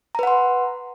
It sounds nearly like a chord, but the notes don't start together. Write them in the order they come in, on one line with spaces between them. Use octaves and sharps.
A#5 B4 F#5 C6